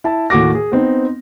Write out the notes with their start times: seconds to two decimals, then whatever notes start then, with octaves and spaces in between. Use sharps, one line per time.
0.04 E4 A5
0.30 D#2 A2 F#4 D6 A#6
0.55 G#4
0.72 B3 C4 D#4